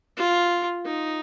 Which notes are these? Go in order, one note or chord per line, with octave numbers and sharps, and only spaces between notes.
F4
D#4